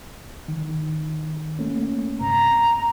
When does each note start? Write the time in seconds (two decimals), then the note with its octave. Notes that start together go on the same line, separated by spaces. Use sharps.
0.48 D#3
1.59 A3 A#3 C#4
2.20 G2 C3 A#5